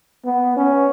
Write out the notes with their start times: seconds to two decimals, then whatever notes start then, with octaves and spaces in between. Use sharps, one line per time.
0.25 B3
0.56 C#4